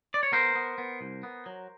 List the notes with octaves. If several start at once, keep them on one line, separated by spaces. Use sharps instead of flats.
D5
C#5
B3 A#4 C5
B3
B3
C2
B3
F#3